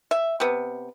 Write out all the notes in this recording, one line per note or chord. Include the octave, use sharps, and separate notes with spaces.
E5
C3 B3